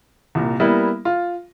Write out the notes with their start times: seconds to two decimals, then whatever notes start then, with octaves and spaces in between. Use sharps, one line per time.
0.35 C2 A#2
0.60 G3 A#3 B3 E4
1.05 F4